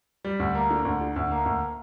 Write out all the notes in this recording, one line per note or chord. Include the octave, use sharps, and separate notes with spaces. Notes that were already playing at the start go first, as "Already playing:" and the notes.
G3
D2
A#3
D3
D2
D3
D2
A#3
D2